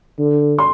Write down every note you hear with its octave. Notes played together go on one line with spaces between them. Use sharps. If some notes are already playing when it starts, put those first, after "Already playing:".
D3
C6